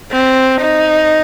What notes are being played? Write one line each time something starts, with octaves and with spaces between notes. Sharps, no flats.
C4
D#4